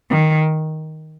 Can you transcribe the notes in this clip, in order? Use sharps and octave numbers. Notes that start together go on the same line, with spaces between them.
D#3